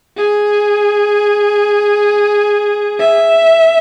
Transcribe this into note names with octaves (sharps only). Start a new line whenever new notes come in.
G#4
E5